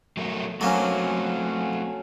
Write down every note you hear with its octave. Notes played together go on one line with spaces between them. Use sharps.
F#3 A3 A#4
F#3 A3 A#3 C4 C#4 F#4 A4